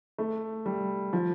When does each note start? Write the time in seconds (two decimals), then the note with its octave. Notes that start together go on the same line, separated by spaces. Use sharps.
0.19 A3
0.66 G3
1.13 F3